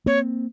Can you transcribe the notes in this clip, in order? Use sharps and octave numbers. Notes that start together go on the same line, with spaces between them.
A#3 C4 C#5